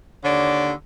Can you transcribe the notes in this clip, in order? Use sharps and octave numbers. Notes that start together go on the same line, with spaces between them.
D#2 D3 C#5 D5